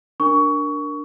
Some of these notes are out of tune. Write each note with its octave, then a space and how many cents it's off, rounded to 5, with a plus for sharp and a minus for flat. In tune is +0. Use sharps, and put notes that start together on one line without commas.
D4 +0 A#4 +0 C#6 +20